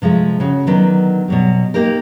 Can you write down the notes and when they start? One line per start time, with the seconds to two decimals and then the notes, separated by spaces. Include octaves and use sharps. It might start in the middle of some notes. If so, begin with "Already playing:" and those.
0.02 C3 F3 G#3 A3
0.40 C#3 F#4
0.67 D3 D#3 F#3 B3
1.28 B2 F#3 G3
1.74 A#3 D#4 G4 A#4